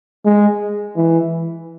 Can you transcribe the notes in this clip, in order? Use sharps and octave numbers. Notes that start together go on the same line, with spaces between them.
G#3
E3